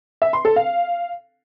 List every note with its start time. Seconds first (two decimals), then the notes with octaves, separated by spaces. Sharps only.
0.22 E5
0.33 C6
0.45 A4
0.56 F5